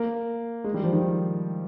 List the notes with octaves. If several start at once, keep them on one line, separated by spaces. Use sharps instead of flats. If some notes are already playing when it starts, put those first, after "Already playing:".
Already playing: A#3
G#3
G3
F3
D#3